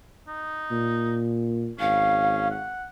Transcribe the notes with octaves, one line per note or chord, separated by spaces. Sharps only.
D#4
A#2
G#1 C#4 F5
F#5